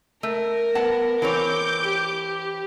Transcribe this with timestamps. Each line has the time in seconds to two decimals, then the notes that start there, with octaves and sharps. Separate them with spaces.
0.23 A3 A#4
0.75 B3 F#5 A5
1.22 E3 C4 C#5 D6 G6
1.82 G4